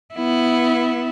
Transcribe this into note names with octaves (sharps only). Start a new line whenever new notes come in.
B3 E4